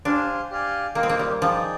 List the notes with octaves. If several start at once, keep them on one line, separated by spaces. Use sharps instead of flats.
D4 G4 C5 F5 G#5
G4 D5 F5 G#5
A#3 F4 A#4 D#5 G5
C4
A#3
G3
F3 D#4 G#4 D5 G5